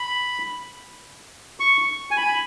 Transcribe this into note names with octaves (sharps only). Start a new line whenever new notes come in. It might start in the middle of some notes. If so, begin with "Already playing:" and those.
Already playing: B5
C#6
G#5
B5